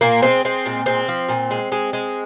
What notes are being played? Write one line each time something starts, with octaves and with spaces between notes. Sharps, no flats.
A#2 A#3
G#3 C4
G#3 C4
A#2
G#3 C4
F3
A#2
G#3
G#3
G#3